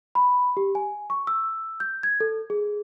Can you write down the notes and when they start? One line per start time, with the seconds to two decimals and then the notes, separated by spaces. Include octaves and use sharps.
0.15 B5
0.57 G4
0.75 G#5
1.10 C#6
1.27 E6
1.80 G6
2.03 G#6
2.20 A4
2.50 G#4